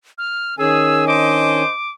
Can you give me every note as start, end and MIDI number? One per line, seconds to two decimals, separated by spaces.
0.18 0.57 89
0.59 1.63 51
0.59 1.63 61
0.59 1.06 68
0.59 1.63 80
0.59 1.07 88
1.07 1.72 62
1.07 1.72 72
1.07 1.72 75
1.07 1.90 86